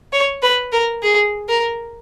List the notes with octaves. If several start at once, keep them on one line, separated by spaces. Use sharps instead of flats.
C#5
B4
A#4
G#4
A#4